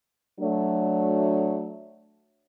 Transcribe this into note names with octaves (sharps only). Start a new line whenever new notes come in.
F#3 A3 D4